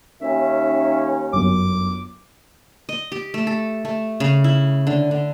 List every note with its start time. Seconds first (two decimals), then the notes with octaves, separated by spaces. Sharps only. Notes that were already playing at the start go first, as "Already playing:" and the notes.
0.22 D#2 D#3 C#4 E5
1.33 G1 F#2 D6
2.89 D#5
3.12 G4
3.34 A3
3.47 A4
3.85 A3
4.20 C#3
4.44 E4
4.87 D3
5.11 D3